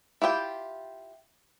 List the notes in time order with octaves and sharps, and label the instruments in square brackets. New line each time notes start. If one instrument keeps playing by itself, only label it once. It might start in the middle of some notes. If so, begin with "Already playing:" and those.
[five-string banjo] E4 F4 G4 G5